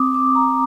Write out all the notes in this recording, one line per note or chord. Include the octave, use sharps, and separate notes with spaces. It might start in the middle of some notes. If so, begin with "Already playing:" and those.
Already playing: C4 D6 D#6
C4 D6
A#5